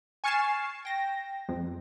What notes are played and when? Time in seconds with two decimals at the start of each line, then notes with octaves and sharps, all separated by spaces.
0.24 G#5 C#6 F6 A6 C7 E7
0.85 G5 A#6
1.49 F2